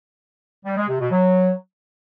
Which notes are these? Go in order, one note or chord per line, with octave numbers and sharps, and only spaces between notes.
G3
G#3
C3
B2
F#3